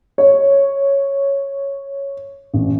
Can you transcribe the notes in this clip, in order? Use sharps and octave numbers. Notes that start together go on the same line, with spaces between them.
C#5
A1